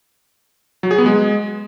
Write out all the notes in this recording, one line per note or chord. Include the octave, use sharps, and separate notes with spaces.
F#3
G#4
B3
G#3